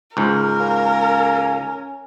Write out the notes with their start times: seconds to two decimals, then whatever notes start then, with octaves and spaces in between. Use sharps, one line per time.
0.17 C#2 G#2 A#4
0.60 A#3 C#4